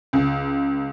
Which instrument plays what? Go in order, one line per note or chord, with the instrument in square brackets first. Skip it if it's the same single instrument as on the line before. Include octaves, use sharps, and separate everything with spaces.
[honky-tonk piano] C#2